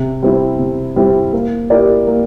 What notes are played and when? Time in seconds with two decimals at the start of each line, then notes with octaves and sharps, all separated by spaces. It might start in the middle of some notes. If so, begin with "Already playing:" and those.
Already playing: C3
0.23 G3 C4 E4
0.59 C3
0.96 G3 C4 E4
1.33 A#3
1.70 E4 G4 A#4 D5
2.07 A#3